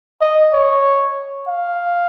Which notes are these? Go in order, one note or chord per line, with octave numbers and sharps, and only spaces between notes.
D#5
C#5
F5